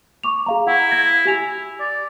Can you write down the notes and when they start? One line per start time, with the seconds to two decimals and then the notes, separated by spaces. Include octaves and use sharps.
0.23 C#6 D6 F7
0.46 G#4 F5 A#5
0.67 E4 F#5
0.91 G#6 A#6
1.25 G4 G#5 F7
1.80 D5